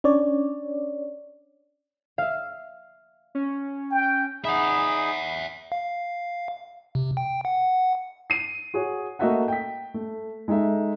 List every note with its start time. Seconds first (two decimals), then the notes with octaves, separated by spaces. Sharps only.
0.04 C#4 D4 C#5 D5
2.18 E5 F5
3.35 C#4
3.91 G5
4.44 D#4 G#4 E5 F#5 B5
5.72 F5
6.95 C3
7.17 G5
7.45 F#5
8.30 C7 D#7
8.74 F#4 G#4 C#5
9.19 A3 A#3 F#4 D#5 E5 F#5
9.48 G5 B6
9.94 A3
10.48 G#3 D#4 A4 E5